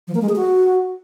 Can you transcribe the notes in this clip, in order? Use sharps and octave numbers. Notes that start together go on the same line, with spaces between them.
F3
A#3
G#3
G#4
F#4